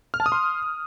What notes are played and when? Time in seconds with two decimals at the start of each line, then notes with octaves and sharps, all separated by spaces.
0.14 F6
0.20 A5
0.26 D#6
0.32 C6